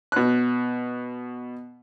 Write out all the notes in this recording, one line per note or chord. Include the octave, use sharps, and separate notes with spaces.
B2 F#6